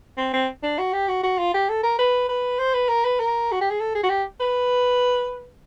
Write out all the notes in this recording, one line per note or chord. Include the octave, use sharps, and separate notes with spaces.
C4
C4
D4
F#4
G4
F#4
F#4
F4
G4
A4
A#4
B4
B4
C5
B4
A#4
B4
A#4
F#4
G4
G#4
A4
G#4
F#4
G4
B4